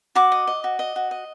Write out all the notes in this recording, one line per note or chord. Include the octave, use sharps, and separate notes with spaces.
F#4 D6
D#5
D#5
F#4
D#5
F#4
D#5